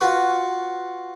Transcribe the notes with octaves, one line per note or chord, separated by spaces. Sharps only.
F4 F#4 B4 F#5 C#6